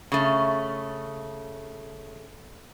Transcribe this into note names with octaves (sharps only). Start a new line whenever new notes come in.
C#3 A3